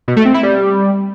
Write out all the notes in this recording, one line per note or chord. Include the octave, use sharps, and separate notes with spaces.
B2
A3
C4
E4
G3